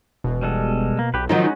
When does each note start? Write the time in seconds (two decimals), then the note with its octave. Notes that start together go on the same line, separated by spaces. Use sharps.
0.24 E1 B2
0.43 G3 G#3 A4
0.99 A#3
1.14 B1 G4 B4
1.29 D#3 F3 F#3 G#3 C#4 D#4 F#4